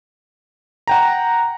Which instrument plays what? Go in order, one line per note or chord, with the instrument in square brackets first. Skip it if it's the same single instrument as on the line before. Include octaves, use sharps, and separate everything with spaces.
[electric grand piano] F#5 G5 A#5